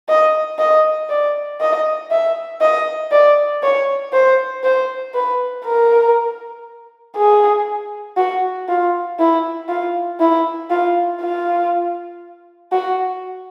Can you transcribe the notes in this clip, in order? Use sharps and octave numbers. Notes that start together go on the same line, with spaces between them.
D#5
D#5
D5
D#5
E5
D#5
D5
C#5
C5
C5
B4
A#4
G#4
F#4
F4
E4
F4
E4
F4
F4
F#4